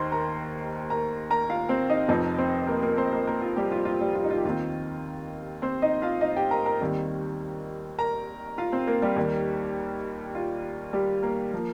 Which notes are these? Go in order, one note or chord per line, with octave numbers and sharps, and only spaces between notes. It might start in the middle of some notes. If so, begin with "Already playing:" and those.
Already playing: D#2 D#3 A#3 C5 A#5 C6
A#4 A#5
A#4 A#5
A#4 A#5
F4 F5
C4 C5
D#4 D#5
F1 F2 F3 C4 D#4 D#5
C4 C5
A#3 A#4
A#3 A#4
C4 C5
A#3 A#4
A#3 A#4
F4
G3 G4
F4
F4
G3 G4
F4
D#4
F4
G4
D#2 D#3 C4 F4
C4 C5
D#4 D#5
F4 F5
D#4 D#5
G4 G5
A#4 A#5
A#4 A#5
D#2 D#3 G3 C4
A#4 A#5
F4 F5
C4 C5
A#3 A#4
G3 G4
D#2 D#3 A#3
F4
G3 G4
A#3 A#4
F3 A#3